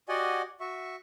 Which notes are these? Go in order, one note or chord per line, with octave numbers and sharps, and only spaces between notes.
F#4 G4 D5 D#5 F#5 G#5
F#4 E5 C#6